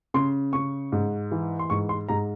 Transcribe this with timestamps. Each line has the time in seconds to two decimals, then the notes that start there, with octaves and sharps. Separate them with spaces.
0.14 C#3 C6
0.53 C#3 C#6
0.92 G#2
1.31 E3
1.59 C6
1.70 G#2 C#6
1.89 C6
2.09 G#2 A#5